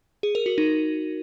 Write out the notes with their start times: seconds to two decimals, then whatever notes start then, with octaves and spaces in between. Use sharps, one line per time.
0.23 G#4
0.35 A#4
0.46 F#4
0.58 D#4